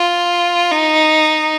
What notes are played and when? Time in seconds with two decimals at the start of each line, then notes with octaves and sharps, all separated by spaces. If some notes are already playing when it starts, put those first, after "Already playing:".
Already playing: F4
0.72 D#4